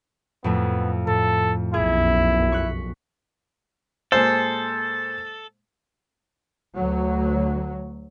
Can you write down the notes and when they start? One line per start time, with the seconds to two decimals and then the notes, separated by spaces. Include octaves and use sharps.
0.44 F2 A2 A3 B3
1.07 A2 A4
1.74 B1 F#2 E4 G#4
2.52 C#6 F#6 B6
4.12 A#2 G#3 A4 C5
6.75 D2 F#3